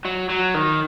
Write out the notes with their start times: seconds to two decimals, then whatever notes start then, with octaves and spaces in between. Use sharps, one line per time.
0.05 F#3
0.30 F#3
0.54 D#3